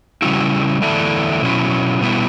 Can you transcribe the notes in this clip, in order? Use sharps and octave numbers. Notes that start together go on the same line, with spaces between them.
C#3 G3 C#4 E4 F#4
E2 D3 A3 D4 E4
B2 F#3 C#4 E4
B2 G3 B3 E4